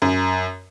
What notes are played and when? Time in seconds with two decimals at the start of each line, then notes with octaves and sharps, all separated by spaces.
0.02 F#2